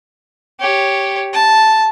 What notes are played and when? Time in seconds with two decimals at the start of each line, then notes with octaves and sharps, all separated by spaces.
0.60 G4 C#5
1.33 A5